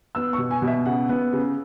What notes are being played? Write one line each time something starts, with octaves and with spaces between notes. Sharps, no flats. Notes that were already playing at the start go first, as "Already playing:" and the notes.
B3 E6
C#6
B2
G#5
B2
E5
C#3 F#5
B3
C#3